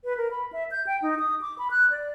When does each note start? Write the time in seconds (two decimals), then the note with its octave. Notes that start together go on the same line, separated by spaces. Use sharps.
0.04 B4
0.17 A#4
0.31 B5
0.53 E5
0.71 G6
0.87 G5
1.02 D#4
1.19 D#6
1.41 D6
1.58 B5
1.71 F#6
1.90 D5